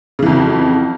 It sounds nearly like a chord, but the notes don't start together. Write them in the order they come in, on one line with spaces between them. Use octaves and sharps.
C#3 E3 F2 F#3